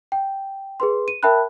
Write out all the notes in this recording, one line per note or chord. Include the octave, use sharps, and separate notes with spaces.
G5
G#4 B4 C6
D#7
A#4 E5 G5 A5 B5 F#6